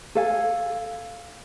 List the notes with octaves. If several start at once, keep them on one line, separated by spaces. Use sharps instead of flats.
A4 F5 G#5